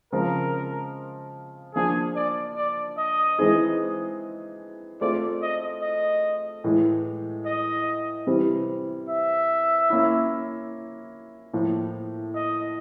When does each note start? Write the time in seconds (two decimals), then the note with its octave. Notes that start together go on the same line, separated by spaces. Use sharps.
0.12 C#3 F3 G#3 C4 A#4
1.75 F3 A#3 D4 G#4
2.15 D5
2.56 D5
2.98 D#5
3.39 E3 G#3 C4 D#4 G#4
5.01 A3 C4 F4 G#4 C5 D5
5.42 D#5
5.82 D#5
6.64 A2 E3 G#3
7.46 D#5
8.27 C3 E3 G3 C4
9.09 E5
9.90 A#3 C#4 E4
11.53 A2 F3 A#3
12.35 D#5